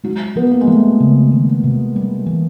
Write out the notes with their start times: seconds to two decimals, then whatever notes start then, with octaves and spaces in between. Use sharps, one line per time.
0.04 F#3 G#3
0.36 F3 B3
0.51 A#3
0.61 G#3
0.67 F3 A3
1.00 C#3
1.32 D#3
1.64 C3
1.96 G3
2.26 E3